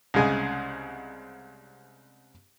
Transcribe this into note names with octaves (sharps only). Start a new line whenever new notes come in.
C2 C#3 G#3 D#5 G#5